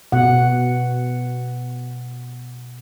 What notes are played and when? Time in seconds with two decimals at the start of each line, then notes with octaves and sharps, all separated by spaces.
0.12 B2 F#5